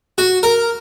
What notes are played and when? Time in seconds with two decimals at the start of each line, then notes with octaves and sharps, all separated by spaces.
0.18 F#4
0.43 A#4